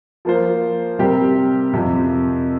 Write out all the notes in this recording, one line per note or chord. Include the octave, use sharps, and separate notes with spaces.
F3 A#3 F4 C5
C3 G3 C4 G4 A#4
F2 C3 F3